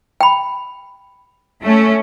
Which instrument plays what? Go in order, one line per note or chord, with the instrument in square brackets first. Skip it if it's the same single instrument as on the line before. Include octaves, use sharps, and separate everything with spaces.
[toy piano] G5 B5
[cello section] A3 C#4